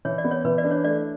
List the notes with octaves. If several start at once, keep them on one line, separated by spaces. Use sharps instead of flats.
E3 C#5
D5
B3
C#5
E3 B4
D5
D4
C#5
A3 D5